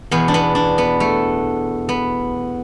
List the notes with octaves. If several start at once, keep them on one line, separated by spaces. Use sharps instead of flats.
E2 B2 B3
D4
B3
D4
B3
A3
B3